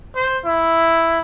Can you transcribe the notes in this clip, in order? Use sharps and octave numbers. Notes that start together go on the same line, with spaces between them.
C5
E4